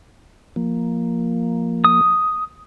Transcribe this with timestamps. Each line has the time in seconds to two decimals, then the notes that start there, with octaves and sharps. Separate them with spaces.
0.56 F3 A#3
1.84 D#6